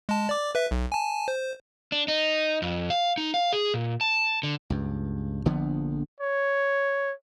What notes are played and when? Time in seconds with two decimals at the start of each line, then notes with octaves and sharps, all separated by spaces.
0.09 G#3 A5
0.29 D5 D6
0.55 B4 E5
0.71 B1
0.92 G#5 A5
1.28 C5
1.92 D4
2.08 D#4
2.62 F2
2.90 F5
3.18 D#4
3.34 F5
3.53 G#4
3.74 A#2
4.01 A5
4.43 D3
4.70 C#2 G2
5.45 A#1 D3 F3 B3
6.20 C#5